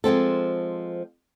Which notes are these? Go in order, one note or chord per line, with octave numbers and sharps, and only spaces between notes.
F3 G#3 C4 A4